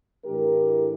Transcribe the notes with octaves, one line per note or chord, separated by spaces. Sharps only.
A2 E3 A3 D4 G4 A#4